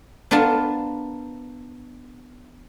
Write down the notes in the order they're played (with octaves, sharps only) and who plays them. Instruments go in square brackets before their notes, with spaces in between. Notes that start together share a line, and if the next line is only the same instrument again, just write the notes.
[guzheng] B3 D4 F4 A#4 A5